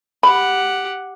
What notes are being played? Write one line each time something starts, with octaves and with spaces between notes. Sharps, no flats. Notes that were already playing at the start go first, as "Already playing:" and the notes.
G4 F#5 B5